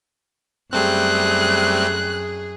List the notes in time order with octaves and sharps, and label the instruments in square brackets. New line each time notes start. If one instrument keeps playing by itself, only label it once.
[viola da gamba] F#2 G#4 [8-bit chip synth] G3 A3 C4 [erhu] F#6